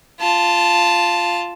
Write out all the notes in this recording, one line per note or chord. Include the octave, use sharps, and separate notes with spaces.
F4 A5